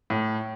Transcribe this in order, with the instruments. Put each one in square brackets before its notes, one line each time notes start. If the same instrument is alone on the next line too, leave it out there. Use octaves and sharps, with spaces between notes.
[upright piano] A2